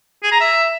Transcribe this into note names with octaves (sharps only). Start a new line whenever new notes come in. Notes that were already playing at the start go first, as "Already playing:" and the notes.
G#4
A#5
E5